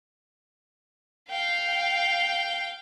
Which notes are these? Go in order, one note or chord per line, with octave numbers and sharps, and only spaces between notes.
F5 G5